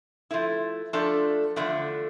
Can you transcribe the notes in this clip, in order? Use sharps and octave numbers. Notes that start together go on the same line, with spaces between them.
F3 A3 E4
F3 A3 D4 A4
E2 D3 F3 A3